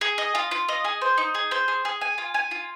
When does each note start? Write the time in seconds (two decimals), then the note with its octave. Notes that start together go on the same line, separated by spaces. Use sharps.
0.01 G#4
0.18 D#5
0.35 F4
0.51 F4
0.69 D#5
0.84 G#4
1.01 C5
1.18 D#4
1.34 G#4
1.51 C5
1.68 G#4
1.85 G#4
2.01 G#5
2.18 F4
2.34 G#5
2.51 F4